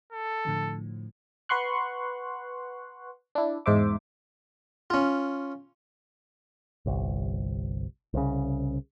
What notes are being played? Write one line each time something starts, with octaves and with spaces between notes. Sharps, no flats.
A4
A2 D3 F3
B4 F#5 C6 C#6 F#6
D4 E4
E2 G#2 D#4 C5 E5 D6
C#4 F4
G1 C2
C2 C#3